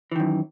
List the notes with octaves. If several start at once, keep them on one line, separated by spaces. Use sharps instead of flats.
F#2 D#3 E3